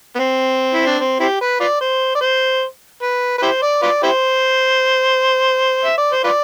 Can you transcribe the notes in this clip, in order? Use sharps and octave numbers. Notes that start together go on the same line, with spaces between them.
B3
C4
E4
D4
C4
C4 E4 G4
B4
F4 B4 D5
C5
D5
C5
B4
B4
E4 G4 C5
D5
F4 B4 D5
E4 G4 C5
E5
D5
C5
F4 B4 D5